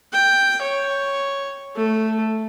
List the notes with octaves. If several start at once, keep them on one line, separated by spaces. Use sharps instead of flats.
G5
C#5
A3